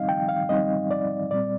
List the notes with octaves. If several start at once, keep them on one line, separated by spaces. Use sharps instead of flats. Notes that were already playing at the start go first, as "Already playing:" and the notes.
Already playing: G3 C4 D#4 D#5 F5
G5
F5
G3 C4 D#4 D#5
D5
A#2 G3 C4 D5